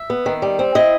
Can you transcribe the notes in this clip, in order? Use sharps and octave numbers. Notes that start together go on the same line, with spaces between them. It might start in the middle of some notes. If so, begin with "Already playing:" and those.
Already playing: E5
B3
D#3
G3
C4
E4 D#5